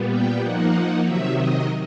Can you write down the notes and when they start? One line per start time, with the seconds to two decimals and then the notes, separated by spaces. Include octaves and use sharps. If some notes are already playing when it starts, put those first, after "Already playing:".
Already playing: A#2 G3 B3
0.09 G5
0.41 F3 A#3 D#4 F#5
1.04 C3 D#3 F#3 E5
1.34 D#5